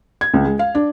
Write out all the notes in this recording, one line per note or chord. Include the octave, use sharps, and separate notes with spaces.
G#6
C#2
G#3
F5
D4